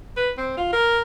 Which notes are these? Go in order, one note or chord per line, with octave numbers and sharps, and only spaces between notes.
B4
C4
F4
A#4